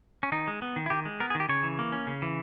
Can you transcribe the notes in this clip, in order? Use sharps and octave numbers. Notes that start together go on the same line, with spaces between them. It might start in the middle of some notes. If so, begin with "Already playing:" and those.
C#4
D#3 D#4
G#3
B3
D#3
E4
D#3 G4
G#3
B3 A#4
G#4
D#3
G4
C#3 C#5
E3
A#3
C#4
C#3
E3